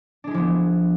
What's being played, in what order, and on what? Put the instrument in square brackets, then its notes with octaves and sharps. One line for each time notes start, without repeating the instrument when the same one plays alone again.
[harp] D4
G#3
E4
F3
B3